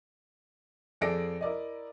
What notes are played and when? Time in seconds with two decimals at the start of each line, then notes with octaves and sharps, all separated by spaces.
1.01 F2 G#4 A4 D5 A#6 D7
1.41 E4 A#4 D5 D#5